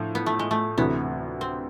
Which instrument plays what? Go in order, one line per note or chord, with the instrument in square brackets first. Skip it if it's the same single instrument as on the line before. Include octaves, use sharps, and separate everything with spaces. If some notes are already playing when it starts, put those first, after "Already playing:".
Already playing: [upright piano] A2 F3 [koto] D4
[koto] B3
A3
G#3
A3
[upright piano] D2 C3 E3 [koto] B3
[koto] C4